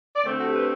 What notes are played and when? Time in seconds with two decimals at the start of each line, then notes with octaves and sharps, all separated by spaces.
0.16 D5
0.23 D2 D3 A3 C4 C5
0.39 F#4
0.45 G4
0.56 B4